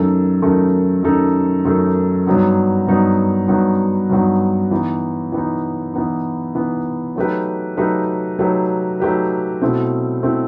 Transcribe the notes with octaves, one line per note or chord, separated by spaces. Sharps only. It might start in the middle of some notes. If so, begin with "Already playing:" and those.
Already playing: F#2 D#3 A3 D#4 A4
F#2 D#3 A3 D#4 A4
F#2 D#3 A3 D#4 A4
F#2 D#3 A3 D#4 A4
G2 F#3 B3 D#4 F#4
G2 F#3 B3 D#4 F#4
G2 F#3 B3 D#4 F#4
G2 F#3 B3 D#4 F#4
E3 B3 D#4
E3 B3 D#4
E3 B3 D#4
E3 B3 D#4
F#3 A3 D#4 G4 B4
F#3 A3 D#4 G4 B4
F#3 A3 D#4 G4 B4
F#3 A3 D#4 G4 B4
B2 A3 C4 E4
B2 A3 C4 E4